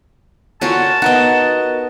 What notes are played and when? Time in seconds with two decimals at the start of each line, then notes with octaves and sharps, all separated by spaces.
0.61 D3 C#4 F4 F#4 A#4 A5
1.02 B3 D#4 F#4 A#4 D#5